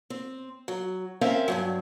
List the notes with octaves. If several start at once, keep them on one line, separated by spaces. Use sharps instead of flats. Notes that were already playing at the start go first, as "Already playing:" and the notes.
C4
F#3
C4 C#4 A#4 C5 E5 F5
G2 B2 F#3